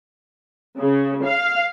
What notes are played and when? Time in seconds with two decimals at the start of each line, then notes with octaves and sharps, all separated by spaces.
0.78 C#3
1.24 F5